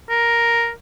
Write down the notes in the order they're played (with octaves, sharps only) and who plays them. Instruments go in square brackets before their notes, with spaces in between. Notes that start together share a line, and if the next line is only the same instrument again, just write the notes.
[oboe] A#4